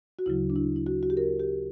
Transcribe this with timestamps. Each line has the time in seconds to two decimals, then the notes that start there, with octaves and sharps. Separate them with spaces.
0.19 F#4
0.26 D2 C#3 F#3 E4
0.50 D4
0.56 E4
0.76 E4
0.86 F#4
1.03 F#4
1.10 G4
1.17 A#4
1.40 G4